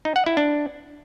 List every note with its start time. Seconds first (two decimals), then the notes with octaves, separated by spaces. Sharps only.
0.05 D#4
0.16 F#5
0.26 E4
0.37 D4